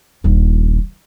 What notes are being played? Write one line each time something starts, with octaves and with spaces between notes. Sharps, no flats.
D#1 A#1